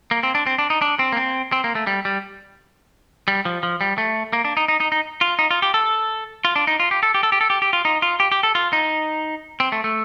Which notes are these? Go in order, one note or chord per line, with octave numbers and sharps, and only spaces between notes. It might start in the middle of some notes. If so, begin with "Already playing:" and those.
A#3
C4
D4
C4
D4
D#4
D4
C4
A#3
C4
C4
A#3
A3
G3
G3
G3
F3
F3
G3
A3
A#3
D4
D#4
D#4
D#4
D#4
F4
D#4
F4
G4
A4
F4
D4
D#4
F4
G4
A4
G4
A4
G4
A4
G4
G4
F4
D#4
F4
G4
G4
A4
F4
D#4
C4
A3
A3